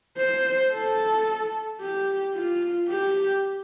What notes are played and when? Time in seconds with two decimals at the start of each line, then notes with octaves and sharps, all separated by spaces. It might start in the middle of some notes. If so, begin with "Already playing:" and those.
0.18 C5
0.72 A4
1.80 G4
2.34 F4
2.88 G4